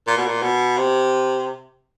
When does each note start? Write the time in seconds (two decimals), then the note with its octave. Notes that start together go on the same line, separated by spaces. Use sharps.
0.07 A#2
0.17 B2
0.27 A#2
0.42 B2
0.77 C3